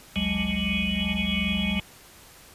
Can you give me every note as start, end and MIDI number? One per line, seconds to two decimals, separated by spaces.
0.16 1.79 32
0.16 1.79 38
0.16 1.79 54
0.16 1.79 56